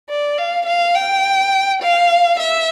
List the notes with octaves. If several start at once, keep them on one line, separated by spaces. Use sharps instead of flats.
D5
F5
F5
G5
F5
E5